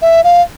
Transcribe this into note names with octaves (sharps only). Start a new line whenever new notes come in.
E5
F5